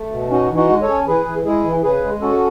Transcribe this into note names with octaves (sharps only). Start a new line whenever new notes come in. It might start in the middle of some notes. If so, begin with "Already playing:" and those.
Already playing: A3
B2
C#4 D#4 F#4
E3
D#4 F#4
G#3
A4 C#5
C#4
E3 G#4 B4
E3
G#3 E4 G#4
E3
C#3 G#4 B4
G#3
C#4 F#4 A4